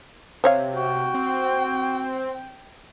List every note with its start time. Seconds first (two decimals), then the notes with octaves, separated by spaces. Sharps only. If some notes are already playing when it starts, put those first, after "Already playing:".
0.44 C3 C5 C#5 F5
0.76 F#4 G5
1.14 C4